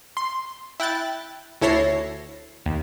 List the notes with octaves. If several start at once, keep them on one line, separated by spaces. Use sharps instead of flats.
C6
E4 G5 F#6 A6
D2 E4 A4 C#5 A#6 C7
D#2